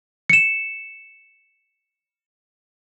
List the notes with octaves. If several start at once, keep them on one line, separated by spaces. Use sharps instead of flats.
C#7 E7